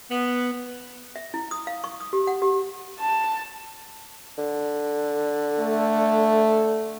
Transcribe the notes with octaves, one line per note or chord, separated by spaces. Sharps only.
B3
E5
E4
D#6
F5
C#6
D#6
G4
F#5
G4
A5
D3
A3